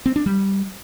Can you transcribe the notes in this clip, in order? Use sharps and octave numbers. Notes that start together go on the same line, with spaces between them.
C4
D4
G3